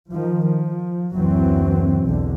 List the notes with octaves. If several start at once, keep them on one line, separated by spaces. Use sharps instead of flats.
D#3 F3
F3
F#1 D2 E3 F#3 C4
B1 E2 D3